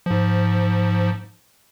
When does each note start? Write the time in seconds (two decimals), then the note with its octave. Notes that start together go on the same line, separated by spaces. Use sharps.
0.06 G#2 F3